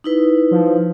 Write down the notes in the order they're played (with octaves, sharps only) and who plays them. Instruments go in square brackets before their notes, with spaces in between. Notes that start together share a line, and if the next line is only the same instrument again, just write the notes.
[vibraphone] D#4 E4 B4
[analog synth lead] F3